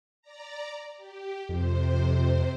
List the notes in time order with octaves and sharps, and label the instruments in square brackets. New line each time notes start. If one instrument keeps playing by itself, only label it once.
[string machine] D5 A#5
G4
[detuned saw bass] F2 [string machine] C3 C5